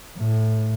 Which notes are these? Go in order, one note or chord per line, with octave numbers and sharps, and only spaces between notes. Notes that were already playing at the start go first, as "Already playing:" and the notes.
A2